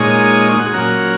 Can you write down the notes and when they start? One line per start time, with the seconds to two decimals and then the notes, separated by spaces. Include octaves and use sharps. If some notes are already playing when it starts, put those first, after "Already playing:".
Already playing: A#2 G#3 D#4 G#4 C#5
0.52 D#4
0.59 F#4
0.66 G#4
0.74 A#2 F#3 C#4 F#4 A#4